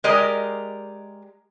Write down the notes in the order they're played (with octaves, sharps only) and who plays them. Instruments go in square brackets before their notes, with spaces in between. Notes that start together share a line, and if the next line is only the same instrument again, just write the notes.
[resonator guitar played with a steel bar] G#3 G4 A#4 D5 D#5